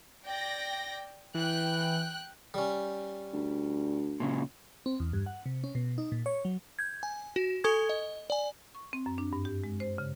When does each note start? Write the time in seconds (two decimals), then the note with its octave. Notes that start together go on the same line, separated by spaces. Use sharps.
0.25 D5 G5 A#6
1.35 E3 G5 F#6
2.54 G3 C#4
3.33 D2
4.20 A#2 C#3
4.86 C4
5.00 E2
5.13 G2
5.26 F#5
5.46 C3
5.64 C#4
5.75 B2
5.98 D#4
6.12 A#2
6.26 C#5
6.45 F#3
6.79 G6 G#6
7.03 G#5
7.36 F#4
7.64 A4 G#5 C#6 D#6 G#6
7.89 D#5
8.30 D5 G#5
8.75 C#6
8.93 C4
9.06 F#2
9.18 D4
9.33 G2
9.45 G4
9.64 G#3
9.80 C5
9.98 C#3